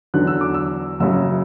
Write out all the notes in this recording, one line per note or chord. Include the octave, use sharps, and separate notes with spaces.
E2 D3 F#3 F#6
E6
D6
E6
F#1 F#2 C#3 F#3 E6